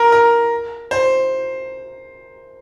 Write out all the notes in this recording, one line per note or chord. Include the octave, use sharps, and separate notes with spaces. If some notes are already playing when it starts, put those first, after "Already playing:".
Already playing: A#4
A#4
C5